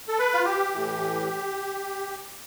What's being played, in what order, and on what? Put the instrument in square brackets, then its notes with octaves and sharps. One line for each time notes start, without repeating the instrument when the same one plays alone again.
[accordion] A4
B4
F4
G4
A2 E3